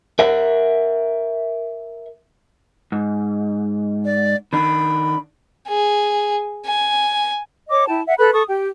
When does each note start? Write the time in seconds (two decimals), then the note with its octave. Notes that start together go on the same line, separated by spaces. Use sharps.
0.19 A#4 E5 F#5
2.92 G#2
4.05 D5
4.53 D#3 D4 B5
5.68 G#4
6.66 G#5
7.70 C#5 D#5 D6
7.87 E4 G5 A5
8.07 E5 F#5
8.19 A4 B4 B5 F#6
8.33 A4 C#6 D#6
8.48 G4 G5